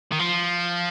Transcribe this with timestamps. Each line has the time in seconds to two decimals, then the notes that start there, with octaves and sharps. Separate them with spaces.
0.12 D#3
0.20 F3